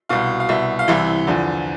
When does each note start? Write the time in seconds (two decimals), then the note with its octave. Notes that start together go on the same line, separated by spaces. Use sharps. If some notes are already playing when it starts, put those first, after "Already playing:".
0.09 C2 B2 F5
0.40 F5
0.49 C2 B2 E5
0.79 F5
0.88 C2 C3 E3 E5
1.27 E2 D3 F3